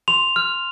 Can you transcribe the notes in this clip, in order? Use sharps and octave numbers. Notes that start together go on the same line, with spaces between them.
C6 F7
F6